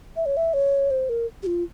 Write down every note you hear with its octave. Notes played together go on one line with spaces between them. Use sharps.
E5
C#5
E5
C#5
C5
A#4
G4
F4